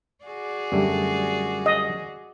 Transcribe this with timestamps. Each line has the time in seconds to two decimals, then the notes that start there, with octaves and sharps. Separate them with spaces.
0.24 F#4 G#4 D5
0.72 F#2 D3 G3 A3 G4 D6
1.66 D#5